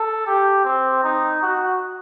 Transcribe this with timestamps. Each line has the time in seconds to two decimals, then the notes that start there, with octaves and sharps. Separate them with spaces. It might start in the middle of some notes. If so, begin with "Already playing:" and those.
Already playing: A4
0.27 G4
0.64 C4
1.04 D#4
1.42 F#4